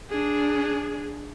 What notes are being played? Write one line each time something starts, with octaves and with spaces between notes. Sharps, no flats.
D4 G#4